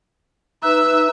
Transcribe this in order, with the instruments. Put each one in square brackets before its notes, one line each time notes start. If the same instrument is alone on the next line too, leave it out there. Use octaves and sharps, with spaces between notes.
[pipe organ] D#4 B4 [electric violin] E5 E6